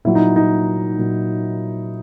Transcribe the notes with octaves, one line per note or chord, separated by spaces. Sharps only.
A#2 F#3 E4
D#4
D#4
A#2 F#3